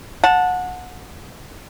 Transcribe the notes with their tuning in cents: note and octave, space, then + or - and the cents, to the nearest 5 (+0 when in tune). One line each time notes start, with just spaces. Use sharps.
F#5 -25 A5 +0